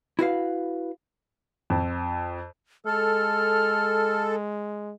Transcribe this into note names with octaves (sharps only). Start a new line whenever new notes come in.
E4 F#4 B4 F5
F2
G#3 A4 F6